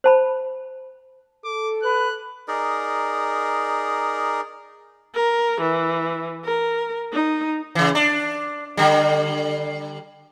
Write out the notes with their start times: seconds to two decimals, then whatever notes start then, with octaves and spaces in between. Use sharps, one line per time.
0.04 C5 A5 B5
1.45 A4 D6
1.83 B4 F#6
2.48 D#4 G#4 A#4 D5
5.14 A#4
5.61 E3
6.45 A#4
7.12 D#4
7.75 C#3 E3
7.95 D4
8.77 D3 G3